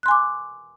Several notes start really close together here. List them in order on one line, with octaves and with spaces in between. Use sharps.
F#6 C6 G#5 D6